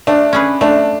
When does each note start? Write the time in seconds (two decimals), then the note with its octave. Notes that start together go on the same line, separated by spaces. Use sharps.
0.07 A3 D4
0.33 C#4 G#4 B4
0.61 A3 D4